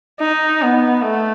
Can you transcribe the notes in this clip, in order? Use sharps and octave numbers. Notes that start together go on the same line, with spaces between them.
D#4
B3
A3